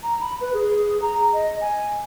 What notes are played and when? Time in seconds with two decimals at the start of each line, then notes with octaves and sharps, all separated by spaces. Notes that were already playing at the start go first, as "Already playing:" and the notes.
0.03 A#5
0.21 B5
0.41 B4
0.54 G#4
1.02 A#5
1.33 D#5
1.61 G#5